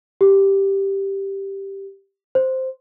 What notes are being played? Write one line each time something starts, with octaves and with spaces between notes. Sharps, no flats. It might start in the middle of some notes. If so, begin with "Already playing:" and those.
G4
C5